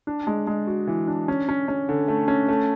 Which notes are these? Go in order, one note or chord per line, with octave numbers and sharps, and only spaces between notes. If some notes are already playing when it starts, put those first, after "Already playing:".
D4
G#3
G#3
F#4
E3
D4
C#4
C#4
C#4
D3
A3
C#4
A3